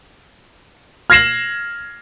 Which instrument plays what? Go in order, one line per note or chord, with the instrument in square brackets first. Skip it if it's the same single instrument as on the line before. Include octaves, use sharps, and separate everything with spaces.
[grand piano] F6 G#6 A#6 C7 E7 F#7